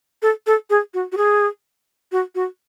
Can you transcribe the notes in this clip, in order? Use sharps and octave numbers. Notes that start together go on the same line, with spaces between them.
A4
A4
G#4
F#4
F#4
G#4
F#4
F#4